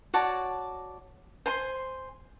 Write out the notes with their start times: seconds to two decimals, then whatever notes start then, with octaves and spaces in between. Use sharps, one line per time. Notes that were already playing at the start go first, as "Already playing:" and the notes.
0.14 F#4 C#5 D5 A5
1.46 C5 G#5 C6